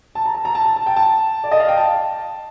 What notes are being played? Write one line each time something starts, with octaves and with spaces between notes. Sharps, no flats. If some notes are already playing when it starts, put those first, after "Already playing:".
A5
A#5
A5
A#5
A5
A5
A5
G5
A5
D5
D#5
F5
G5
A5